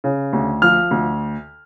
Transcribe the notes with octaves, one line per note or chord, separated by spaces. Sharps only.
C#3
D2
F3 F6
D2